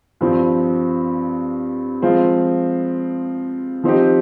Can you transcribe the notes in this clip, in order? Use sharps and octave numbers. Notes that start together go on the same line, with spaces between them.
G2 F3 C4
F3 G#3 C4 F4
F3 C4 D#4 G4